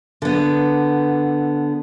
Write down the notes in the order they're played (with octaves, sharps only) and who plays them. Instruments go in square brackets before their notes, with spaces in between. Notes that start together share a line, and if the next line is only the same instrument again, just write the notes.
[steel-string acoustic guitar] D3 B3